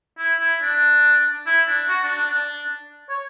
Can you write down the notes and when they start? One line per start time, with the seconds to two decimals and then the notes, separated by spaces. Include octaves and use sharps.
0.18 E4
0.40 E4
0.62 D4
1.47 E4
1.68 D4
1.89 F#4
2.03 D4
2.18 D4
2.31 D4
3.09 C#5